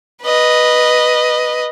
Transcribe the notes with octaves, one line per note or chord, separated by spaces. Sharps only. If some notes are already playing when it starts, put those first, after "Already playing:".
B4 D#5